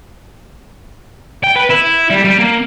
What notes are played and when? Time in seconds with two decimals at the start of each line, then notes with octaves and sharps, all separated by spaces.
1.44 G5
1.56 B4
1.70 E4
2.10 G3
2.25 G3
2.38 A#3